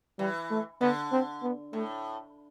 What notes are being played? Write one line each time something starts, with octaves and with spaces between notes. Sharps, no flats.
E3 G3
A3
D3 B3
C4
B3
A2 A3